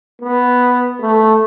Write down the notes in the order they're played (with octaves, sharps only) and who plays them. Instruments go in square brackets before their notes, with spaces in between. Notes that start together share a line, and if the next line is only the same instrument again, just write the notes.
[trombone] B3
A3